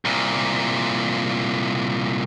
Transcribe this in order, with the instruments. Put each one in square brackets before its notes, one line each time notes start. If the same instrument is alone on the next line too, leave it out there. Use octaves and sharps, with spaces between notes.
[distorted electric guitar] C2 A#2